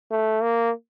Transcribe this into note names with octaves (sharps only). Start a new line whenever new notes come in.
A3
A#3